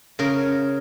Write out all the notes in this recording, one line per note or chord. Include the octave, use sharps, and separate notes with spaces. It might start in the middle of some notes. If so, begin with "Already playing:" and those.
C#3 A#4